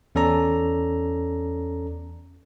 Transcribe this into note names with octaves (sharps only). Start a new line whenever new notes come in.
E2 C#4 A4 D5 A#5